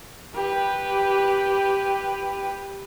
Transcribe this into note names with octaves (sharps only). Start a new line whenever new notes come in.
G4 B4